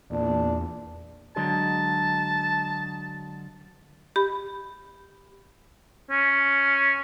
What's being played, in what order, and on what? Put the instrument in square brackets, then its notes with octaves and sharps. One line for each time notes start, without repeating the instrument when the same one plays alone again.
[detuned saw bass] E2 [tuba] A#2 [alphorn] D4
[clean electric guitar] D3 F#3 G#3 [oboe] A5
[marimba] G4 B5
[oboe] C#4